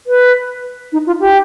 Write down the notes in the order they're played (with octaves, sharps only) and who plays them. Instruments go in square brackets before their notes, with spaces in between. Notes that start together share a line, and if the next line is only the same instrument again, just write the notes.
[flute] B4
D#4
F4
G4